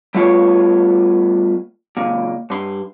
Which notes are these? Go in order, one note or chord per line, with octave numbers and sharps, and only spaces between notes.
G3 A3 B3 F4 C5 C#5
C#2 A#2
G2 C6